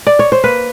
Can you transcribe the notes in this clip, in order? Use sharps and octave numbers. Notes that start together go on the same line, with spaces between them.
D5
C#5
C5
A#3 B4